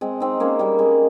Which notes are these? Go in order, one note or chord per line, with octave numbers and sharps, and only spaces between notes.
G#3 C4
C4 D#4
A#3 C#4
G3 A#3
G#3